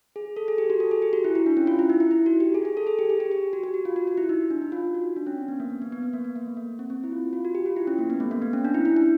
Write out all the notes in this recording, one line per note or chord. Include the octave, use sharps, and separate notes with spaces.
G#4
A4
G#4
G4
F#4
A4
G#4
G4
F#4
E4
E4
D4
C#4
F4
E4
D#4
E4
E4
F#4
G4
G#4
G#4
A4
G#4
G4
G#4
G4
G4
F#4
G4
F#4
F4
F#4
F#4
E4
D#4
D4
D#4
F4
F#4
D4
C#4
C4
B3
A#3
B3
B3
B3
B3
A#3
B3
A#3
A3
A#3
C4
C4
E4
F4
F4
F#4
G4
F4
E4
C#4
A#3
B3
A3
A#3
B3
C#4
D4
E4
E4
D4